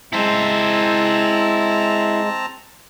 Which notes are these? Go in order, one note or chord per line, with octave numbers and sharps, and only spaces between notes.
G#3 C4 E4 C5 A5 A#5